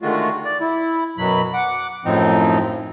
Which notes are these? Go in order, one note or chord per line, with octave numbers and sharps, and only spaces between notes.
D3 D#3 G#3 A3 F4 F#4
D5
E4
F#2 B2 F#3 B5
F#5 D6
F#2 A2 F3 C4 D#4